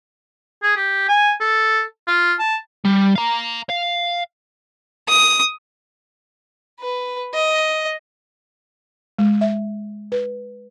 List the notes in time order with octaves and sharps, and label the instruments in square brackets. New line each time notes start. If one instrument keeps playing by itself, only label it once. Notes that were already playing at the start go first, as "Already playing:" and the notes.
[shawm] G#4
G4
G#5
A4
F4
A5
[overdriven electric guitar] G3
F5 A#5
F5
[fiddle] D#6
B4
D#5
[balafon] G#3
E5
B4